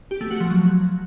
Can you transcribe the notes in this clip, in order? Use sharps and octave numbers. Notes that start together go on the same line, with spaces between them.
G4
A3
F#4
F3
F#3